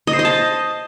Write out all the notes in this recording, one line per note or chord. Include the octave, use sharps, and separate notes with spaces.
D#5
C5
D#5
A5